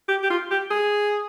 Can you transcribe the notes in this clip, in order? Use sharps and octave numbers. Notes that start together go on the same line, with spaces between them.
G4
G4
F4
G4
G#4